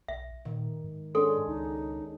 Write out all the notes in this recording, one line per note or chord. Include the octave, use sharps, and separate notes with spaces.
B1 E5
A#2 D#3
G#2
G#3 C#4 D4 A4 C6
C#2 D#4